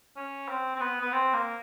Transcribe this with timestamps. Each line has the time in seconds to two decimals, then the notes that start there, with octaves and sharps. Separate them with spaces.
0.17 C#4
0.49 C4
0.76 C4
0.81 B3
1.01 B3
1.12 C4
1.34 A#3